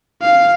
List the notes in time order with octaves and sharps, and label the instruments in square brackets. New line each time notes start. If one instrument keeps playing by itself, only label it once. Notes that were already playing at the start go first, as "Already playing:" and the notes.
[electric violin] F5